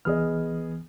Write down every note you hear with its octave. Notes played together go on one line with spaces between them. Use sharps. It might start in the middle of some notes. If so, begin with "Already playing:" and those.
C2 E3 B3 G#4 D#5 F6